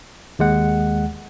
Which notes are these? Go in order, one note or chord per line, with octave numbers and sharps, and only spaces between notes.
D#2 G#3 F#5